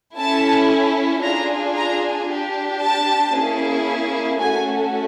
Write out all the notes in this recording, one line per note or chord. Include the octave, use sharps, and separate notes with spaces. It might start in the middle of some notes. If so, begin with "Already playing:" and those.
C#4 E4 A4 A5
D4 F4 G#4 A#5
A#5
D4 G4
A5
A#3 C#4 E4 G#4
A3 C#4 F#4 A4 G#5